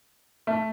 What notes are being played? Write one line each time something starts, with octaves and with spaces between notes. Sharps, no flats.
A3